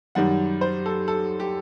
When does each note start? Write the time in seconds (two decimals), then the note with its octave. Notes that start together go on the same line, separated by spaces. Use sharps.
0.15 F#2 D#3 G3 F#5
0.61 C5
0.86 A4
1.08 A4
1.40 G4